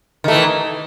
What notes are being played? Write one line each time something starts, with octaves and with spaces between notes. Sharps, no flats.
D#3 E3 A3